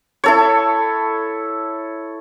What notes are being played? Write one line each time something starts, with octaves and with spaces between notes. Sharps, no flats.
E4 A4 C#5